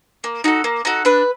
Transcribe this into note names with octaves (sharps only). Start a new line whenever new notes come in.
A#3
D#4 F#4 A4
A#3
D#4 F#4 A4
D4 B4